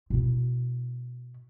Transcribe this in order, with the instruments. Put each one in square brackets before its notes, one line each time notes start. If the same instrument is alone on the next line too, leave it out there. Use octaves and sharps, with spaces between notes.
[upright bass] B2 E4